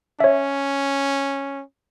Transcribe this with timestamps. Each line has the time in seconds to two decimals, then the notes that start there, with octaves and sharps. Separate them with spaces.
0.20 C#4 C#5 E5